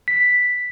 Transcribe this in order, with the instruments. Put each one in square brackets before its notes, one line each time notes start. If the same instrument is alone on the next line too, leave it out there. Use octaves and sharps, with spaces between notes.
[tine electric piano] B6